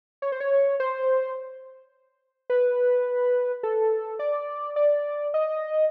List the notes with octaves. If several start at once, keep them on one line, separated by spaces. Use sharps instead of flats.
C#5
C5
C#5
C5
B4
A4
D5
D5
D#5